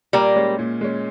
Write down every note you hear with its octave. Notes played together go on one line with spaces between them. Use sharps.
A#2 G3 A#3
G#3 C#4
A#2
G#3 C#4